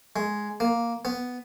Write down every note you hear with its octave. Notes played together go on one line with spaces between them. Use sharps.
G#3
A#3
B3